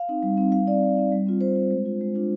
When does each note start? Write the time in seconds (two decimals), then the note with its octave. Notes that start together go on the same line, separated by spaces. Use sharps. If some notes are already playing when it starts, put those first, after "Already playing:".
Already playing: F5
0.08 C4 D#4
0.23 G3
0.37 C4 D#4
0.52 G3 F5
0.67 C4 D#4 D5
0.83 G3
0.97 C4 D#4
1.12 G3
1.26 C4 F4
1.41 G3 C5
1.56 C4 F4
1.71 G#3
1.86 D4 F4
2.01 G#3
2.15 D4 F4